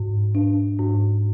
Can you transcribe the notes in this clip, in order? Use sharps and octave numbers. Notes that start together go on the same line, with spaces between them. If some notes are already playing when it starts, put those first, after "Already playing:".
Already playing: G#2
D4
G#2